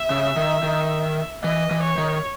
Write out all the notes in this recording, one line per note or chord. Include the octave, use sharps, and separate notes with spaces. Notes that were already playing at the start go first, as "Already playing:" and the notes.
Already playing: E5
C#3
D#3
D#3
E3 D#5
E3
C#5
D#3